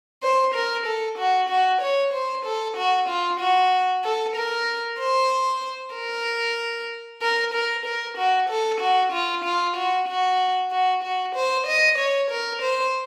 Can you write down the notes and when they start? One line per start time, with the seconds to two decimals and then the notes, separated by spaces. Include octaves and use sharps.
0.23 C5
0.55 A#4
0.86 A4
1.18 F#4
1.49 F#4
1.81 C#5
2.13 C5
2.45 A4
2.77 F#4
3.09 F4
3.40 F#4
4.04 A4
4.36 A#4
4.99 C5
5.95 A#4
7.22 A#4
7.54 A#4
7.85 A#4
8.18 F#4
8.50 A4
8.81 F#4
9.12 F4
9.44 F4
9.77 F#4
10.08 F#4
10.72 F#4
11.03 F#4
11.35 C5
11.67 D#5
11.99 C#5
12.31 A#4
12.62 C5